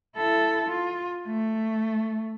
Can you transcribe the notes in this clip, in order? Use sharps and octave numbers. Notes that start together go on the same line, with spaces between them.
E4 A4
F4
A3